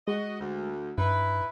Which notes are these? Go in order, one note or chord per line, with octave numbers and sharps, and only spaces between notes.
G#3 F#4 D#5
D2
G2 D#4 E4 B4